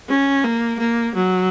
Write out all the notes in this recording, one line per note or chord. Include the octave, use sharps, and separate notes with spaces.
C#4
A#3
A#3
F#3